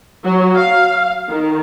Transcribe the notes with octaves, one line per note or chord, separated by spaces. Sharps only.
F#3
F5
D#3